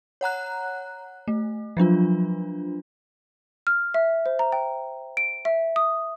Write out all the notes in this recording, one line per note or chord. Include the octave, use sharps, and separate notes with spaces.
C#5 F#5 A#5 F#6
A3
F3 F#3 D4 F4
F6
E5
C5
A#5
G5
D7
E5
D#6